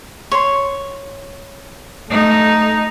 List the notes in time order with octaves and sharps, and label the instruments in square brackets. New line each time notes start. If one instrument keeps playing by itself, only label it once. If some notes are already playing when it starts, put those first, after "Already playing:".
[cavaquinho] C#5 C6
[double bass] A3 [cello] D#4